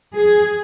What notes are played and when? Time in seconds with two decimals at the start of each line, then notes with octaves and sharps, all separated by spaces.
0.16 G#4